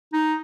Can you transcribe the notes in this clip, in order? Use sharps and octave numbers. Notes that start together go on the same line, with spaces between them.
D#4